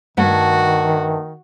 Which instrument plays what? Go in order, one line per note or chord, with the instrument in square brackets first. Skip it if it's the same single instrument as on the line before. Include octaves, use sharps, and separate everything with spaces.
[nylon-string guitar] G2 A3 F#5 [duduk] D#3 [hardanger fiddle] F#4